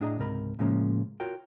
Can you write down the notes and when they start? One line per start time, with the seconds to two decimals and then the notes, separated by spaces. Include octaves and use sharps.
0.01 A2 D4 G#4 D#5 A#5
0.18 C#2 G#2 C3 A#4 B5
0.59 A2 C#3 F3 G#3 A#3 C#4
1.20 F4 F#4 A#4 C#5 G5